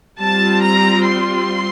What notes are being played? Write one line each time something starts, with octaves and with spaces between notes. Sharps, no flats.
G3 C4 F4 A5
A#5
C6